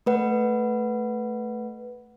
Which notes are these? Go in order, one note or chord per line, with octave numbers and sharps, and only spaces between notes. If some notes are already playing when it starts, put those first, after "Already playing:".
A3 B4 F#5